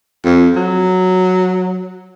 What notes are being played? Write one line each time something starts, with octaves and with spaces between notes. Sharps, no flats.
F2
F#3